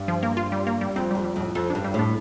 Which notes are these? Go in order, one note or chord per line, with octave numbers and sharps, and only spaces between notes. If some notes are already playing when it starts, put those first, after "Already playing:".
Already playing: G2
F3
A#3
F4
G3
A#3
G3
F2 C4
F2 G3
G3
F2 A2
F2 A4
G2 D4
G3
A2 D4